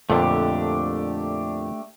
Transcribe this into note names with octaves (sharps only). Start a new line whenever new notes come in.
F2 A#2 D3 A3 D4 G4